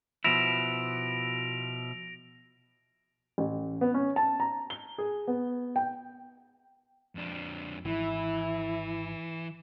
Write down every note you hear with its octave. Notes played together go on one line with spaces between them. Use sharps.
B2 F3 E4 A#6 D7 F7
A1
B3
C#4
A5
A#5
G7
G#4
B3
G5
F2 D4
G#1 E3 E4